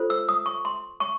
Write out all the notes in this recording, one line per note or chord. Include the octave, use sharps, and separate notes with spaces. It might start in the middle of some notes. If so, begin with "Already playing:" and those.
Already playing: F4 A4 C5
E6
D#6
C#6
C6
C#6